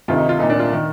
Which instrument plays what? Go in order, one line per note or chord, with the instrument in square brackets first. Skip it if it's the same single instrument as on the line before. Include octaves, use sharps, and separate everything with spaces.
[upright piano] D2 C3 D#3 F4
D#4
F4
C2 D#4
A#2
D4
F4
D#3